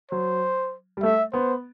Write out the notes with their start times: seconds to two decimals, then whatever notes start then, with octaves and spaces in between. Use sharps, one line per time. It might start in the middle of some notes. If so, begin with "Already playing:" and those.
0.11 F#3 C5
0.97 G3
1.03 A3 E5
1.33 B3 C5